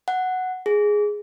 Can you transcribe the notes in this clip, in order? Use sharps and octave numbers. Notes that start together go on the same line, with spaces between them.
F#5
G#4